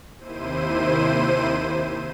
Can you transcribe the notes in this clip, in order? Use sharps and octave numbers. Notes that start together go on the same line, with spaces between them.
D#2 C3 E4 C5 D#7